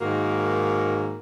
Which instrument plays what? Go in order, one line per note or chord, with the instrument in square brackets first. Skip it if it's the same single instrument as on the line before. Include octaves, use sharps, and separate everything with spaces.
[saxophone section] G#2 D#3 A#3 F#4